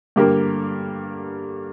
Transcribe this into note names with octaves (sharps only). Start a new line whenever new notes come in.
G2 D3 A#3 G4 A#4